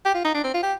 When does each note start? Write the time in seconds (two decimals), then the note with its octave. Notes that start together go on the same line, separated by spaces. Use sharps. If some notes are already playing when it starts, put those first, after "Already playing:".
0.05 G4
0.14 F4
0.25 D#4
0.34 D4
0.44 C4
0.54 F4
0.63 G4